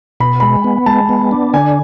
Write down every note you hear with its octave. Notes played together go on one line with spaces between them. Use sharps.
B2 B5
G#3 B5
B3
G#3 A5
B3
D4
D3 G#5